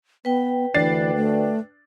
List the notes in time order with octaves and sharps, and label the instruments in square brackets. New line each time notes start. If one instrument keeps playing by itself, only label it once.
[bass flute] B3 [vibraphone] B4 G5
[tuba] D2 [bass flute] E3 [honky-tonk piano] D4 A6 C7
[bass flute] A3